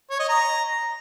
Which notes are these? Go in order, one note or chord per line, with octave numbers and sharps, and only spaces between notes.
C#5
D#5
A#5